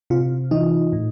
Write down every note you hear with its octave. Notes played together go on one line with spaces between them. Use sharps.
C3 F4
E3 D#4
A2